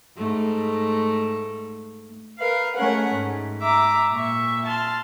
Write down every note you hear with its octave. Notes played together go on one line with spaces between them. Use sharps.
G#2 A3
A#4 B4 F5
G#3 A3 C#4 A#4 F#5
G#2
E5 A#5 D6
A#2 E5 C#6
A5 C6 F6